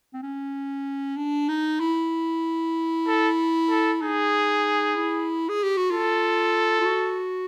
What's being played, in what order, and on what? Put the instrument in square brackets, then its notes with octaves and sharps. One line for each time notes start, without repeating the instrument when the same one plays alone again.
[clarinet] C4
C#4
D4
D#4
E4
[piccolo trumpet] A4
A4
[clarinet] D#4 [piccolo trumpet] G#4
[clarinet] E4
G#4
G4
F#4
[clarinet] F4 [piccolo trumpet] A4
[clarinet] F4
F#4